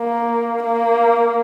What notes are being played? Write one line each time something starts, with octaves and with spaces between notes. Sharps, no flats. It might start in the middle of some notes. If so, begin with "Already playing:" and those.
Already playing: A#3
A#3